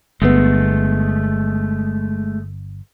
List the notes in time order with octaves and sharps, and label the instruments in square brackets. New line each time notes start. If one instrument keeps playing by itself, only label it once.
[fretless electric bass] G1 B3 [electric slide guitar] G#3 A3